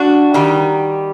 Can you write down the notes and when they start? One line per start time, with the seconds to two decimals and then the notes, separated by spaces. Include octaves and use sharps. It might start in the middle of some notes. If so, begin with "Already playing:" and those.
Already playing: D4 F#4
0.34 D#3 G3